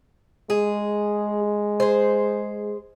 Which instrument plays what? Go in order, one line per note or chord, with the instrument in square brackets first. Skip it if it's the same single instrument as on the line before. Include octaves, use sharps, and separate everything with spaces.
[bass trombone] G#3 [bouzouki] G#4
[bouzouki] G#4 C5